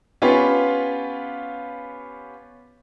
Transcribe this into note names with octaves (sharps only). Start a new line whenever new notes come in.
B3 C#4 F4 G4 B4 F5